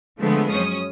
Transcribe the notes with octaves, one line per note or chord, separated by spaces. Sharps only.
D3 F3 G#3 A3 B3
F#2 C#4 D#6